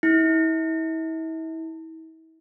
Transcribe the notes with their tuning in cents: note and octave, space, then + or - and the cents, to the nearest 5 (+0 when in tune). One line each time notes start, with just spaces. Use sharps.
E4 -40